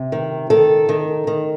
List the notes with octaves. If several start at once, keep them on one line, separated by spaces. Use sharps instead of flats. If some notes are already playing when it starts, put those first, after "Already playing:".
Already playing: C3
D#3
D#3 A4
D#3
D#3